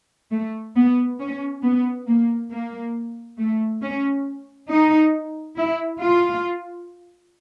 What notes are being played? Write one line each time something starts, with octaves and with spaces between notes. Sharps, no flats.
A3
B3
C#4
B3
A#3
A#3
A3
C#4
D#4
E4
F4